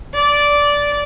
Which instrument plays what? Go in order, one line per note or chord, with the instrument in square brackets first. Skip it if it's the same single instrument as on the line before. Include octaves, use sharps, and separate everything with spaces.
[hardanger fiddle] D5